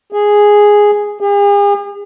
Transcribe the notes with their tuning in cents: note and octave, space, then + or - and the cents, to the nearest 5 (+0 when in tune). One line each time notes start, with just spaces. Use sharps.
G#4 -5
G#4 -45